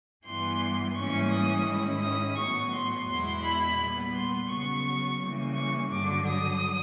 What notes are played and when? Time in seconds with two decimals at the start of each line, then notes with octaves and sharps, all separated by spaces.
0.24 G2 E3 G3 B3 C6
0.94 G#2 E3 G3 A#3 C#4 C#6
1.30 D#6
1.65 G#2 D#3 G#3 C#4 E4
2.01 D#6
2.36 A2 F#3 B3 C#6
2.72 C6
3.07 E2 B2 G#3 B3 E4 C6
3.42 B5
3.77 A#2 G3 B3
4.12 C6
4.48 C#3 F#3 B3 C#6
5.19 C#3 E3 G3 A#3
5.54 C#6
5.90 G2 D3 F#3 D6
6.25 D#6